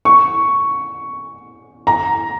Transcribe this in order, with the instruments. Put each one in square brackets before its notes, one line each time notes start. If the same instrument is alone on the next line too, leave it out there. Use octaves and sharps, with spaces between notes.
[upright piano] C#6
A#5